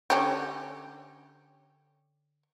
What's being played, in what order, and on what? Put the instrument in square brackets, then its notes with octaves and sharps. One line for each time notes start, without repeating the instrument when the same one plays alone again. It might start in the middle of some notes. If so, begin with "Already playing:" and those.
[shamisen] D3 C#4 G4